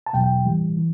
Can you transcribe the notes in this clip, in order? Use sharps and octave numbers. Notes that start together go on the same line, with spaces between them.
A5
E2 B2 F#3 G5
G5
A2 E3 G3
E3